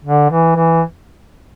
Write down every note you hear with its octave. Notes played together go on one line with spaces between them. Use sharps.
D3
E3
E3